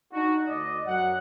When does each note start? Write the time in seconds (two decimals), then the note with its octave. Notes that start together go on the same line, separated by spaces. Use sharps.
0.12 D4 D#4 F#4
0.47 D2 D5 D#5
0.87 F#2 F#5